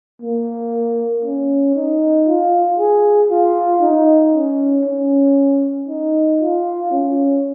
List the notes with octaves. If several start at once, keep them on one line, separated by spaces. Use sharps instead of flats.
A#3
C#4
D#4
F4
G#4
F4
D#4
C#4
C#4
D#4
F4
C#4